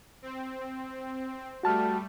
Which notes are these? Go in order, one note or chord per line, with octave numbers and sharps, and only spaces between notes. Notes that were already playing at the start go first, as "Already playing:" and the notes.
C4
G3 A3 F#4 A5 F6